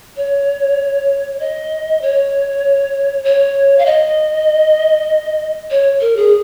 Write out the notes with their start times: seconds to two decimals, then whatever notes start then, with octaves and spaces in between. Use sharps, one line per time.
0.17 C#5
1.39 D#5
2.02 C#5
3.24 C#5
3.79 F5
3.86 D#5
5.71 C#5
6.01 A#4
6.16 G#4